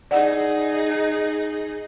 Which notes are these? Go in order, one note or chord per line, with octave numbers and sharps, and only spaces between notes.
D#4 G#4 D5 F#5